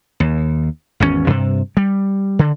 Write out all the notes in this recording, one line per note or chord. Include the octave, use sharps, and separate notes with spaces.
D#2
G#1 E2 C3 C#4
G2 C3
G3
D3